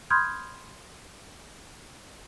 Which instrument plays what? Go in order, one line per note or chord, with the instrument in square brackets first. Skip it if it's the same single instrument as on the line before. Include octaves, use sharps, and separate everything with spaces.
[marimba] B5 C6 D#6 F6 G6 G#6